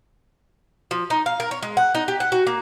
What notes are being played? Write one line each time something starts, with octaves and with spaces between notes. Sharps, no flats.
F3
D#4
F5
A#4
C#5
G#3
F#5
D#4
G4
F#5
F#4
A#3